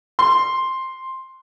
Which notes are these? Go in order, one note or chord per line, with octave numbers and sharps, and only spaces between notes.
C6